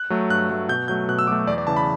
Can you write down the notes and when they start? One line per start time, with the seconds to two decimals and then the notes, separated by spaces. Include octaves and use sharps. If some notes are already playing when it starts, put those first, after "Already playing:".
Already playing: F#6
0.10 F#3 A3
0.30 G2 F#6
0.50 F#3 A3
0.69 B2 G6
0.88 F#3 A3 G6
1.08 B2 F#6
1.19 E6
1.27 F#3 A3 D6
1.47 E2 D5
1.58 D5
1.67 C#3 E3 A5
1.77 B5